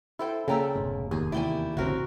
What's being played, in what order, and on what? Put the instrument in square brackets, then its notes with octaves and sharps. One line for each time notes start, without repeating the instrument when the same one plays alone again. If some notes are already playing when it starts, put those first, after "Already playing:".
[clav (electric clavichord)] E4 [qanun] A4 C5 G5
[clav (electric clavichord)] C#3 [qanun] A#3 D5 E5 [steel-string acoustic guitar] A4 G5 A#5
[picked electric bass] F1 G#2 A3 [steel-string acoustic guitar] B2
[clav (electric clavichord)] D#2 [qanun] G#4
[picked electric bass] E2 C3 [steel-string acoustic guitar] A#3 E4 [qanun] D5 G5 G#5
[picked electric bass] A1 D2 G2 [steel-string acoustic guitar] C#3 C4 [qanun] F#4 A#4